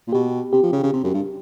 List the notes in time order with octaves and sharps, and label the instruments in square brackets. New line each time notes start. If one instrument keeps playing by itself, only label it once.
[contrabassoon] A#2
[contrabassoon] B2 [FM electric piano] G4
[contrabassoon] C3 [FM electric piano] G4
[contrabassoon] F3
C#3
C#3
C3
F#2
G2